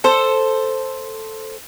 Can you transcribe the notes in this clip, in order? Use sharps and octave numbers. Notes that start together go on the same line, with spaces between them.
A4 C5